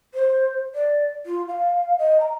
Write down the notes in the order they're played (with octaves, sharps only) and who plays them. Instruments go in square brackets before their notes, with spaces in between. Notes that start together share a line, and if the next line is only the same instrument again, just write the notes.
[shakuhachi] C5
D5
F4
F5
D#5
A#5